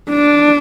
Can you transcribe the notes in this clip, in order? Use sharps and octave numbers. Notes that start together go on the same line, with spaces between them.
D4